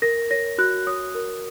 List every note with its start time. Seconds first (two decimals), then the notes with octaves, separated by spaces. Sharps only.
0.02 A#4 A#6
0.31 C#5 A#6
0.58 F#4 F#6
0.87 C#5 D#6
1.15 A#4